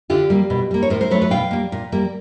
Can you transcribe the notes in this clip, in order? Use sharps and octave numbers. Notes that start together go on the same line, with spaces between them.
D3 F4 G4
G3 A#3
B2
G3 A#3
C#5
A2 A#4 C5
A#4 C5
F#3 A3 B4 C#5
B4 C#5
B2 F5 G5
G3 A#3
A#2
G3 A#3